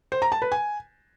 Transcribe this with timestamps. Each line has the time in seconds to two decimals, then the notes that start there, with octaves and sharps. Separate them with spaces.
0.12 C5
0.22 A#5
0.32 A5
0.42 B4
0.52 G#5